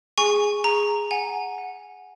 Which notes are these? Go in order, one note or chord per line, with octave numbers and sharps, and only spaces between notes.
G#4 G#5 C#6
G#4 A#5
F#5 G#5
F#5